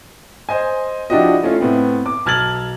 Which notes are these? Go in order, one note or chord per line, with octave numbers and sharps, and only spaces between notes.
C5 D#5 G#5
F3 D4 E4 F#4 G4 D#5
A3 C#4 E4 F4
A2 B3 C4
D6
B1 A5 F6 G#6 A6 F#7